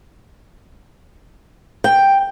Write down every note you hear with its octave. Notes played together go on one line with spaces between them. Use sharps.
G5